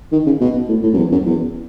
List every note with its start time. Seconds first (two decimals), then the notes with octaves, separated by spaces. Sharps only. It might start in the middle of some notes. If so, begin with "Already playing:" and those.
0.12 D#3
0.26 C#3
0.40 B2
0.68 A2
0.83 A2
0.93 F#2
0.97 E2
1.12 F#2
1.26 E2